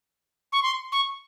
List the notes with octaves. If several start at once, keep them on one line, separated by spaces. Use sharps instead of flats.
C#6
C6
C#6